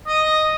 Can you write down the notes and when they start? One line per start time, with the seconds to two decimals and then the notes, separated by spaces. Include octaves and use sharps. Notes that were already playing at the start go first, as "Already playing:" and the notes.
0.07 D#5